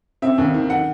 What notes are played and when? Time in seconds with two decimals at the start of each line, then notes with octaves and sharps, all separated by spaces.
0.22 C4 E5
0.38 D#2
0.54 D#3
0.70 F#5